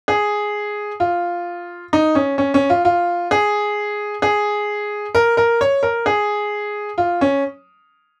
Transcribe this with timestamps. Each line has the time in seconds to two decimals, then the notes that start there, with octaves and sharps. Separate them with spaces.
0.08 G#4
1.00 F4
1.93 D#4
2.15 C#4
2.38 C#4
2.54 C#4
2.70 F4
2.85 F4
3.31 G#4
4.22 G#4
5.15 A#4
5.37 A#4
5.61 C#5
5.83 A#4
6.06 G#4
6.98 F4
7.21 C#4